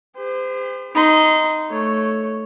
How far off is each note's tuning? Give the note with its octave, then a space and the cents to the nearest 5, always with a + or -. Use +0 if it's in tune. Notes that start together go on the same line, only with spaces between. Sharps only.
G4 +45 C5 -35
D#4 +0 C6 -30
A3 -5 C#5 +0